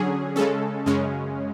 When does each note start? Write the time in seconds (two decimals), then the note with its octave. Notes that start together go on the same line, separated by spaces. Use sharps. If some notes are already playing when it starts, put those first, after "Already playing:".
Already playing: D3 F#3 C#4 G#4
0.36 C#3 G#3 C#4 A4
0.86 F#2 C#3 G#3 C#4